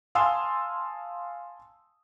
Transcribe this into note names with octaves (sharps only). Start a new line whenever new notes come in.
F5 G#5 A5 C6 D#6 E6